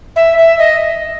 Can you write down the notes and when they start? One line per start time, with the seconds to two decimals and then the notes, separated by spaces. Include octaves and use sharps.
0.16 E5
0.38 E5
0.59 D#5